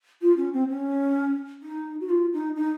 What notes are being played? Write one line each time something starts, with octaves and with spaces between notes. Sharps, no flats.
F4
C#4
C4
C#4
D#4
F#4
F4
D#4
D#4